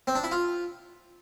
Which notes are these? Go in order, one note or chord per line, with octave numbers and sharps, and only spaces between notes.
C4
D4
E4
F4